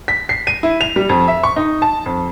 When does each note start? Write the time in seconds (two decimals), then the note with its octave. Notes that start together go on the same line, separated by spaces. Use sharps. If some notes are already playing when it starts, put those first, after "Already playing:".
0.08 B6
0.29 C7
0.47 D#7
0.63 E4
0.81 F7
0.96 G3
1.09 F2
1.28 E5
1.43 C#6
1.56 D#4
1.82 A5
2.06 F2